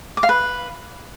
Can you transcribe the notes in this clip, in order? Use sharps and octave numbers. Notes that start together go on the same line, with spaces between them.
D6
F5
B4